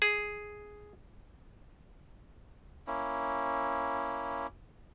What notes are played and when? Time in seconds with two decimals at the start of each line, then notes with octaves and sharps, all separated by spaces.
0.02 G#4
2.87 A#3 C#4 E4